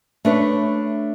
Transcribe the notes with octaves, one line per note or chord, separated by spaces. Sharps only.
A3 D4 B4 C#5